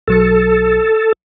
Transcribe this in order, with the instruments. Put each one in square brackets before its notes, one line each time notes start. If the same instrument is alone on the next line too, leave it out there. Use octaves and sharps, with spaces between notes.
[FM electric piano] B1 F#3 C#7 [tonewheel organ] A4